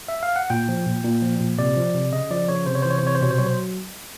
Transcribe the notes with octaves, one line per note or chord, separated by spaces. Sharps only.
E5
F5
F#5
A#2 G5
F3
A#2
A#2
F3
A#2
C3 D5
F3
C3
C#3 D#5
F3 D5
C#3 C#5
C3 C5
C#5
E3 C5
C#5
C5
C3 C#5
C5
B2 C#5
C5
F#3 C#5
C5